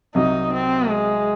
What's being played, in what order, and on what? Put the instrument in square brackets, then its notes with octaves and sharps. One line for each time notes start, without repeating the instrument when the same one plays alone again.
[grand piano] C2 C3 F#3 [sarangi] D#4
[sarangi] C4
G#3